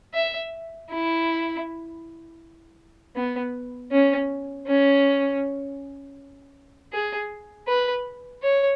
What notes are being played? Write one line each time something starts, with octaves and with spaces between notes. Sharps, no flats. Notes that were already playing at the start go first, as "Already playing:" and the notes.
E5
E4
B3
C#4
C#4
G#4
B4
C#5